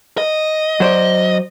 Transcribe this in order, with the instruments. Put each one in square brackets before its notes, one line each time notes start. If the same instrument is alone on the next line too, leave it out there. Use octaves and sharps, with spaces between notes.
[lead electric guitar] D#5
[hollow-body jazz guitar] F#3 C5 D5